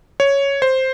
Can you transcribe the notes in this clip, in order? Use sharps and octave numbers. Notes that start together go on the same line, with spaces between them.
C#5
C5